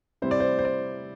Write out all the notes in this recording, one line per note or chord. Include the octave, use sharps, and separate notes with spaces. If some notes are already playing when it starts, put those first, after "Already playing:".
C3 G3 C4 E4 C5
D5
C5
C5
D5